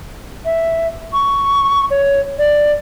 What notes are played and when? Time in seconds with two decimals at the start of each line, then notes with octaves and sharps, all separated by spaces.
0.45 E5
1.13 C#6
1.91 C#5
2.38 D5